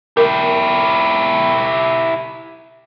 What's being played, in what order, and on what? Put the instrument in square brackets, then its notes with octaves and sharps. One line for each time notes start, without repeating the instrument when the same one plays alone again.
[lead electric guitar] E4 G4 [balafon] A#4